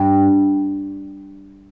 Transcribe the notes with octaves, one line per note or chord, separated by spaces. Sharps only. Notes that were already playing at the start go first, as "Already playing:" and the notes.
Already playing: G2